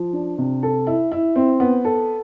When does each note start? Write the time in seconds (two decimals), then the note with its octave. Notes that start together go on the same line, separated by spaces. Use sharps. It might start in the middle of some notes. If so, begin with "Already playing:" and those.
Already playing: F3
0.13 D4
0.38 C3
0.63 A4
0.87 E4
1.12 E4
1.36 C4
1.60 B3
1.85 A4